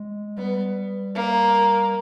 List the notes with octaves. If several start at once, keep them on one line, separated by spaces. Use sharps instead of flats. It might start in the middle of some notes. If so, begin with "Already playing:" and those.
Already playing: G#3
G3 B3
A#3